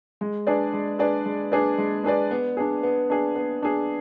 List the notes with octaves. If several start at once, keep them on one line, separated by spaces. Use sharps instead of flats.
G#3
D4 G#4 B4 D5
G#3
D4 G#4 B4 D5
G#3
D4 G#4 B4 D5
G#3
D4 G#4 B4 D5
B3
D4 G#4
B3
D4 G#4
B3
D4 G#4